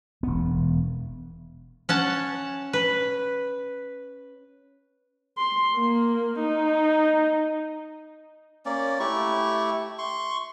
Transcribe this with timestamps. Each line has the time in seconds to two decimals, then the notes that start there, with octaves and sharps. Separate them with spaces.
0.23 E1 B3
1.89 C#4 F#5 A5
2.73 B4
5.38 C6
5.75 A#3
6.40 D#4
8.65 A#3 C#4 D5
9.00 A3 E4 G4 C#6
9.99 C6 C#6